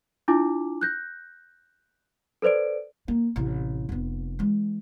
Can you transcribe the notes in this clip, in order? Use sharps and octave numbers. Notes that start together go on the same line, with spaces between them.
D4 E4 F4 G#5 D6
F#6 G6 A#6
A4 B4 C5 D5 D7
A#3
A1 C3
F1 B3
E3 G#3